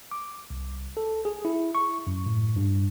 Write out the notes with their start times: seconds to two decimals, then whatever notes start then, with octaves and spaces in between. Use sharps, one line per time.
0.11 D6
0.50 C2
0.97 A4
1.25 G#4
1.45 E4
1.75 C#6
2.07 F#2
2.26 A2
2.56 G2